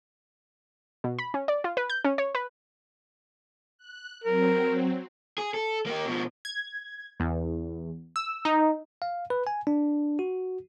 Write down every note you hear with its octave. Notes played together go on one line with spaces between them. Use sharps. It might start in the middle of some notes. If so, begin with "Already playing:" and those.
B2
B5
C#4
D5
F4
B4
G6
C#4
C#5
B4
F#6
F#3 C4 A#4
G#4
A4
A#3 G4
B2 F3
G#6
E2
E6
D#4
F5
B4
G#5
D4
F#4